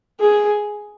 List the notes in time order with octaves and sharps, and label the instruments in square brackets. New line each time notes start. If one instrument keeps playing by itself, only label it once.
[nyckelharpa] G#4